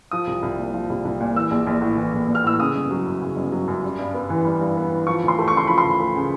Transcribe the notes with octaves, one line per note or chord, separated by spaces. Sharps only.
F3 D#6
C2
C2
A#2
F3
C2
C2
A#2
E3 E6
A#1
A#1
A2
E3
A#1
A#1
F6
A2 E6
C#3 D#6
G1
F#3
F#2
C#3
G1
F#3
F#2
G3
G2
B3
E3
G3
G2
B3
E3
F3 C#6
D2
C6
A3
C#6
C#3 C6
F3 B5
C6
D2
A3
C#3